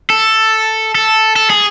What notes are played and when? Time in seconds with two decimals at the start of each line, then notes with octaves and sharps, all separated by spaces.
0.10 A4
0.95 A4
1.36 A4
1.50 G#4